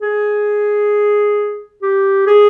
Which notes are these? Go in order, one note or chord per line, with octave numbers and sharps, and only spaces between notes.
G#4
G4
G#4